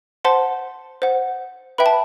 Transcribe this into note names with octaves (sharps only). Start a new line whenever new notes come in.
C5 F#5 A5 C6
C5 F#5
B4 E5 G5 B5
A5